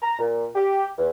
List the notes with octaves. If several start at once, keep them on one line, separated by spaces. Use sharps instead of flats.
A#5
A#2
G4
E2